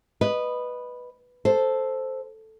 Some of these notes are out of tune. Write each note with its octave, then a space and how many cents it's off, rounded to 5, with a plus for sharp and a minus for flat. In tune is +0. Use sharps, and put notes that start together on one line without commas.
B4 +0 D#5 -15
A4 +0 C5 +0